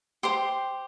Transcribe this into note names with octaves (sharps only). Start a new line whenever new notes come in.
G4 C5 C6